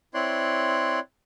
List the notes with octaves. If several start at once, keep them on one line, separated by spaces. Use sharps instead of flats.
C4 E4 C#5 D5 C6 F#6